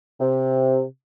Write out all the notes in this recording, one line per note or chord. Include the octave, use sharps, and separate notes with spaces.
C3